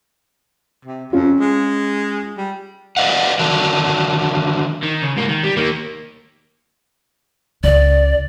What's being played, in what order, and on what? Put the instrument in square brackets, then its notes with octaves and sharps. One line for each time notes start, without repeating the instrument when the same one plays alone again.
[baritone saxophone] C3
[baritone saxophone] F2 [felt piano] C#4 F4
[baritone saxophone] G#3
G3
[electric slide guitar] B4 D5 D#5 F5 F#5
D3 D#3 F#3 D4
[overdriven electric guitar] D#3
C#3
G#2 A#3
D#3
G3
D#3 A#3
[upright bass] C#2 [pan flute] D5